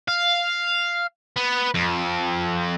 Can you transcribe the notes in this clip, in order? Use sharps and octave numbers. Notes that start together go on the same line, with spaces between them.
F5
B3
F2